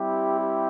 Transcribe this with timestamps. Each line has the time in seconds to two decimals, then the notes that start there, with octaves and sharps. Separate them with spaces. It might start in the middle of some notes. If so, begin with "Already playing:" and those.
Already playing: G3 C4 E4 G4
0.39 G4